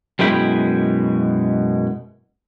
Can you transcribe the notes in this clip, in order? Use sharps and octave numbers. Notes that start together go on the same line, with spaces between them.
F#2 B2 G#3 E4 G5 B5